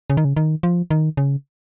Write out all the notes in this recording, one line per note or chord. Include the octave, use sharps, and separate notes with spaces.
C#3
D#3
C#3
D#3
F3
D#3
C#3